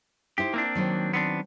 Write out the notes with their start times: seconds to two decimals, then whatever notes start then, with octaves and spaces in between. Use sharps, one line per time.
0.38 D#4 E4 G4 C5
0.54 A#3 C4 D4
0.75 D#3 F#3 C5
1.14 B3 C4 D4